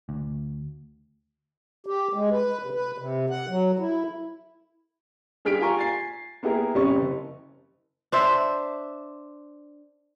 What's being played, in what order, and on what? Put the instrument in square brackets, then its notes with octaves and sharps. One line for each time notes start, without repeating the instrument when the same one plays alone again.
[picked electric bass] D2
[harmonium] G4
G#3
B4
C3
B4
C3
F#5
F#3
E4
[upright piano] G2 G3 G#4 F6 B6 D7
F4 G4 A#4 G#5 A#5 C#6
G#5 A6 C7
A#3 B3 E4 G4 G#4 A#4
A1 C3 G3 C#4 C#6
F#1
[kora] D4 C5 E5